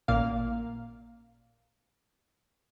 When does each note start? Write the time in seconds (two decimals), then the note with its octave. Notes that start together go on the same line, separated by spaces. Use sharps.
0.08 A1 A#2 A#3 F5